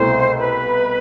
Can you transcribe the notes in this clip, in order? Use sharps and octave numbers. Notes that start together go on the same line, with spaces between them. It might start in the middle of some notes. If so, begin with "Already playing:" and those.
Already playing: C2 B2 A3 E4 C5
B4